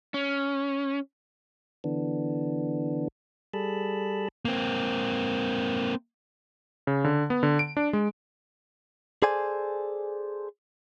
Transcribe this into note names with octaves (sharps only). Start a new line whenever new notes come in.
C#4
D3 E3 B3 D4
G3 G#4 A4 A5 B5
A#3 C4
C#3
D3
B3
D3
D7
D4
G#3
G#4 A4 C5 D5 G#5